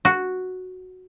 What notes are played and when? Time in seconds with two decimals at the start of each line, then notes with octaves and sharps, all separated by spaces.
0.05 F#4